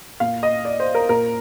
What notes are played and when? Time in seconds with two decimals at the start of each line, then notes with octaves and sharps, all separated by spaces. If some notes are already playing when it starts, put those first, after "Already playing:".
0.20 A#2 F5
0.43 D#5
0.65 D5
0.80 C5
0.95 A#4
1.09 A#2 A#4